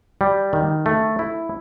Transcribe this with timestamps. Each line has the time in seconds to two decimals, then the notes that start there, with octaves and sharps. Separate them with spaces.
0.21 G3
0.53 D#3
0.86 A3
1.19 E4